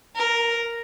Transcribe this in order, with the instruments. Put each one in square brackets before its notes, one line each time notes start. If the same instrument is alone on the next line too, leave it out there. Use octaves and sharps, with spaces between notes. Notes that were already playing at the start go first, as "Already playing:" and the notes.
[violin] A#4